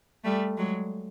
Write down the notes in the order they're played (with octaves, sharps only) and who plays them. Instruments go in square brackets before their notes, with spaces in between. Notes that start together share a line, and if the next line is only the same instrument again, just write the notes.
[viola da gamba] G3 A3
F#3 G#3